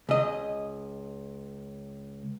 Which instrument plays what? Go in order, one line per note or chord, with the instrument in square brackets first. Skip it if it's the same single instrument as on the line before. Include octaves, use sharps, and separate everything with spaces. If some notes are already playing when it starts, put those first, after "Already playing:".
[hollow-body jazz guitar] C#2 D#5